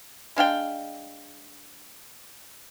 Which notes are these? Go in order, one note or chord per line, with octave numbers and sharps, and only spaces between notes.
G#3 D4 F5 G5